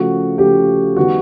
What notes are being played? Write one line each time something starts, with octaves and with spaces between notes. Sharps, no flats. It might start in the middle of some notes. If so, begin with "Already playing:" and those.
Already playing: C#3 F3 A3 F#4
C#3 F3 A3 G4
D#3 G3 B3 F#4